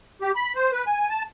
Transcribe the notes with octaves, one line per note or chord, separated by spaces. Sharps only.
G4
B5
C5
B4
G#5
A5